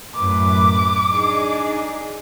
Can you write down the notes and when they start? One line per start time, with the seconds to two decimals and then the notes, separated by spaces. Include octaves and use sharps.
0.15 F#2 A2 B4 D6
1.10 D4 D#4 G#4